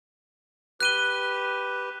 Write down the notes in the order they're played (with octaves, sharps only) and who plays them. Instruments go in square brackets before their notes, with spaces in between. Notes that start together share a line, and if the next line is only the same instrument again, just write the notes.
[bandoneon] G4 B4 [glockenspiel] F#6 D#7 G7